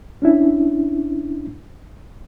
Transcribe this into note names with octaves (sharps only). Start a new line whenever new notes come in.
C#4 D4 E4